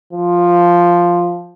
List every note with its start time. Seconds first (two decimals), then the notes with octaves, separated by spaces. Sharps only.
0.13 F3